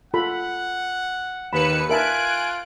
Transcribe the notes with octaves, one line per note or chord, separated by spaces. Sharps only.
F4 A4 F#5 B5
D#2 B4 B5 C#7 E7
F4 A#4 E5 G#5 A5 F#6 D7